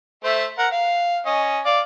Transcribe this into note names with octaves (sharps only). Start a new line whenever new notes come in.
A3 C5 E5
A#4 F#5
F5
C#4 D#5
D5 F5